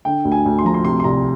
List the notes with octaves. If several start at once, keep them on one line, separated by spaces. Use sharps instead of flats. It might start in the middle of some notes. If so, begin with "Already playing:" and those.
D3 G5
D2
G#5
D2
C6
F3 A#5
C6
C3 C6
C6
C2 A#5